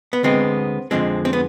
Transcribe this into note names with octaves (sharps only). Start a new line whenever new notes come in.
B3
D2 D3 G#3 B3 C4
F2 D3 F3 G#3 C4
C4
B3